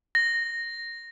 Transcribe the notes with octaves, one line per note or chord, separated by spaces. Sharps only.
A#6